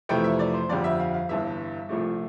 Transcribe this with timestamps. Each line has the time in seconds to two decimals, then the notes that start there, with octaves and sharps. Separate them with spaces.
0.09 F2 C3 E3 A3 G5
0.24 E5
0.39 D5
0.54 C5
0.69 G1 F2 D3 G3 D5
0.84 E5
1.00 F5
1.14 F5
1.29 G1 G2 E3 E5
1.89 C2 A#2 F3 A3